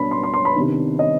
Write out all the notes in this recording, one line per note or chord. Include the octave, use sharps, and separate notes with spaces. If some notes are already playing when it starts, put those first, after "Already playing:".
Already playing: B2 B3 D4 B5
C6
C6
C6
B5
C3 D#3 B3 D4
D#5